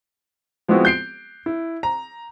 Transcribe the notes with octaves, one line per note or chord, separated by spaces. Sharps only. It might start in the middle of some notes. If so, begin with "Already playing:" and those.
F3 G#3 B3 C4 E4 F#4
G6 C7 D7
E4
A#5